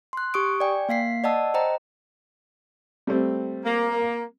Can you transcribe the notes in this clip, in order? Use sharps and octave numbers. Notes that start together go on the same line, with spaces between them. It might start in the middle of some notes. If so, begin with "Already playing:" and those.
C6 F#6
G4 C#6 D#6 D7
D5 G5 G#5
A#3 F5 B6 C7
D5 D#5 F#5 A5 E6
C5 D#5 G5 A#5
G3 A3 C4
A#3